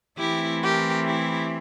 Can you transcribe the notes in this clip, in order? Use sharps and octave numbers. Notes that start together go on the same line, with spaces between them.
E3 A3 C4 E4 G4
G4 A#4
E4 G4